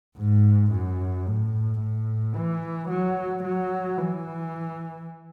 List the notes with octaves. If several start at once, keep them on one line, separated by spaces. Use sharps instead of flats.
G#2
F#2
A2
A2
E3
F#3
F#3
E3